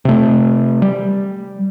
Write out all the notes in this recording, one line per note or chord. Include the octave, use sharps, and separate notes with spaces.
C3 A3
G3